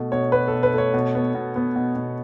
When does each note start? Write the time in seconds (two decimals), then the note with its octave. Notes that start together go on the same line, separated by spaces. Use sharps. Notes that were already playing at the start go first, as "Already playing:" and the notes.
Already playing: B2 A3
0.12 B2 C#5
0.32 B2 B4
0.48 A4
0.53 B2
0.63 B4
0.74 A3 C#5
0.94 B2
1.15 B3
1.35 B2
1.56 B3
1.76 B2
1.96 B2